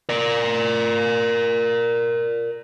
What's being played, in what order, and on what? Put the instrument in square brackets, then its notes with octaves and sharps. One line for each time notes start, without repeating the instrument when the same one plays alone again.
[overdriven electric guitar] A#4 D5